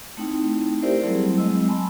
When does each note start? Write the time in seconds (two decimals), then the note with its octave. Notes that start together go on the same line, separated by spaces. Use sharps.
0.17 A3 C4 D#4 E4 G5
0.82 E4 G4 A#4 C5 D5 E5
1.04 F#3 G3 A3 C4 E4 G#4
1.38 F#3 G#3 C4 D#5 E6
1.68 G#5 A5 B5 C6